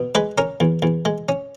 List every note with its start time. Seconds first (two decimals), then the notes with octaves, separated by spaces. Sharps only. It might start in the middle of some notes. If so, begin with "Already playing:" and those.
Already playing: B2
0.15 G#3 B4
0.38 C#4 A#4
0.60 E2
0.82 E2
1.05 G#3
1.29 C#4